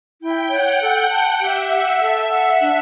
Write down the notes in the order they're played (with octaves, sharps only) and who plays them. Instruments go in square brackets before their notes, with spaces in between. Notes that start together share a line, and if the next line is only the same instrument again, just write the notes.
[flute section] E4 [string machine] G5
[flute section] C#5 [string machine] F#5
[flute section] A4
A5
[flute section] G4 [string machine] E5
[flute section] F#5
A4
F#5
D4